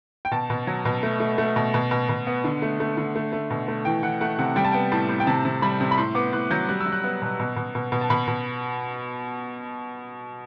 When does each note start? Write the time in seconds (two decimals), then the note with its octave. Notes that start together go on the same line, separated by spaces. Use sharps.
0.25 G5
0.31 B2 A5
0.50 B2
0.67 F#3
0.85 B2
1.03 A3
1.20 A3
1.38 A3
1.56 B2
1.74 B2
1.91 B2
2.09 B2
2.27 B3
2.44 D3
2.62 A3
2.80 A3
2.97 D3
3.15 A3
3.33 A3
3.50 B2
3.68 A3
3.85 E3 G5
4.03 E3 F#5
4.21 A3 F#5
4.39 C3 F#5
4.56 G3 G5
4.64 A5
4.72 B3 G5
4.92 A2 A5
5.09 A2
5.20 G5
5.27 C3 A5
5.45 C3
5.62 G3 B5
5.81 C3
5.91 B5
5.98 A2 C6
6.15 B3 D6
6.33 A2 F#6
6.51 F#3 G6
6.69 G3 F#6
6.81 E6
6.86 G3
6.92 F#6
7.04 B3
7.22 B2
7.40 B2
7.56 B2
7.75 B2
7.92 B2
8.01 A5
8.10 B2 B5
8.28 B2